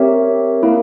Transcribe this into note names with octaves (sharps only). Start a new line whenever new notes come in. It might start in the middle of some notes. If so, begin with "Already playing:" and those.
Already playing: C4 G4 A#4 C#5 E5
A#3 E4 A#4 F5